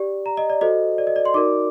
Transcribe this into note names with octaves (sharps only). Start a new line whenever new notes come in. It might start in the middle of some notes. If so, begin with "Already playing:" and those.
Already playing: G4 D5
A#5
D#5
D5
F#4 A4 C5 D#5
D5
D#5
D5
C6
D#4 F#4 A#4 D5 D6